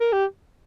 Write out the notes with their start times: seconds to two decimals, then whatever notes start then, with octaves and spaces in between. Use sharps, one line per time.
0.01 A#4
0.13 G4